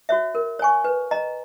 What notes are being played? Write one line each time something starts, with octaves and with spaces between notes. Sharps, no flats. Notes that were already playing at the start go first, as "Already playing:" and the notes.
F#4 C#5 E5
A#4
C#5 G#5 C#6
B4
D#5 A#5